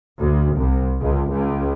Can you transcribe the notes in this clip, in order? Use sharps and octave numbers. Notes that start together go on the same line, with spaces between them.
D2
C2
C#2
C#2